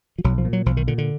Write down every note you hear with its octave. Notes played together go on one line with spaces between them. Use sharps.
F3
B1 F#3
F3
A#2
F#3
B1 F3
D#3
A#2 D3
D3